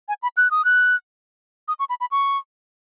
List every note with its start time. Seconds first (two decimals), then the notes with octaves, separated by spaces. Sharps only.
0.09 G#5
0.23 B5
0.37 F#6
0.51 D#6
0.65 F#6
1.68 D#6
1.79 C#6
1.89 B5
2.00 B5
2.11 C#6